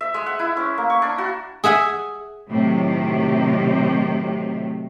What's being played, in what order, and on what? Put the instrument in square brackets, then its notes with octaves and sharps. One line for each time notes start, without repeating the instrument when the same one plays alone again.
[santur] E5
G#3
F#5
E4
C#4
A#3
C#6
D4
F#4
[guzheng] G#4 E5 F#5 G#5
[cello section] A2 C3 D#3 F#3